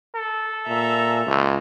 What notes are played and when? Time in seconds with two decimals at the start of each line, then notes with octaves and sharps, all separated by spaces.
0.15 A4
0.67 A#2 E5 A#5
1.27 C#2